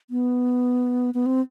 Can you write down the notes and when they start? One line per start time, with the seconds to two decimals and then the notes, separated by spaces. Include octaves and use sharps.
0.10 B3
1.14 B3
1.26 C4